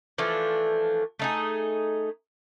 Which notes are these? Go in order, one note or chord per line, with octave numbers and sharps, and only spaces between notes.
E3 F3 A3 D4
A3 D#4 G#4